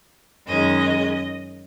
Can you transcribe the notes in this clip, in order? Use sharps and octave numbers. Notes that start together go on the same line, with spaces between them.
F#2 D#3 G#3 C#4 D#5